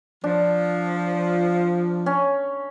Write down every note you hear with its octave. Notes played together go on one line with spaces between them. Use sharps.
F3 D4
C#4